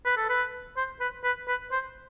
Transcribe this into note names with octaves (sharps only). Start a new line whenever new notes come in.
B4
A4
B4
C5
B4
B4
B4
C5